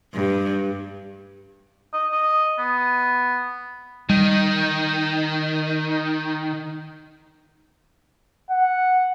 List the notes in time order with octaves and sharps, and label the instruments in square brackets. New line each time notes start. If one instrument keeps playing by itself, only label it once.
[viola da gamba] G2
[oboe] D#5
D#5
B3
[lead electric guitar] D#3 [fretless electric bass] G3
[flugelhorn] F#5